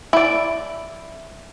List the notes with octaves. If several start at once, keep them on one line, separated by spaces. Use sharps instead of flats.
E4 D5